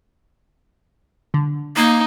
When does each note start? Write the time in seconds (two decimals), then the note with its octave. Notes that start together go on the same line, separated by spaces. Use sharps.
1.34 D3
1.76 A#3 D#4